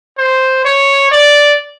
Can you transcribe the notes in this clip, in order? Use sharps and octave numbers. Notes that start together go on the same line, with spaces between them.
C5
C#5
D5